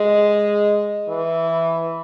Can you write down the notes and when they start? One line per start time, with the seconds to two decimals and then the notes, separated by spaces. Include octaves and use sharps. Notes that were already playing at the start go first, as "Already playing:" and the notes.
Already playing: G#3
1.09 E3